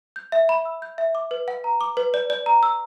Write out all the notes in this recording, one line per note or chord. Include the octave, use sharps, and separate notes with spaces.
G6
E5
B5
E6
G6
E5
D6
B4
F#5
A#5
D6
B4
D5
D5
A#5
E6